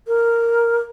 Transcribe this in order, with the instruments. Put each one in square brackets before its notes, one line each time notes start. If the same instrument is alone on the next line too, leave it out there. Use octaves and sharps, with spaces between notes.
[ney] A#4